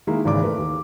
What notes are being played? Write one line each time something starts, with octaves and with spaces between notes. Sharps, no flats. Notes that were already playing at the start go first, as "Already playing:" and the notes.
D#3 G#3 A#3 E4
G#1 G#2 C#3 E3 D5 D6
A3 A#4 B4
D#2